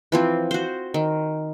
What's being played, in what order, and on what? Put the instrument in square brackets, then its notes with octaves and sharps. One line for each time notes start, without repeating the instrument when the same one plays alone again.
[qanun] E3 F3 C4
F#4 C5
D#3